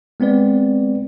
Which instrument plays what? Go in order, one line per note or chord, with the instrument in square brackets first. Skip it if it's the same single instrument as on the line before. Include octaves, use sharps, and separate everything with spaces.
[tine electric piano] G#3 B3 C4 B4 D5